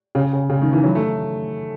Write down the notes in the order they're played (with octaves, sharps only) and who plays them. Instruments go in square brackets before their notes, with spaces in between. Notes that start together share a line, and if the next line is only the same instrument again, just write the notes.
[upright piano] C#3
C#3
C#3
D#3
E3
F#3
A3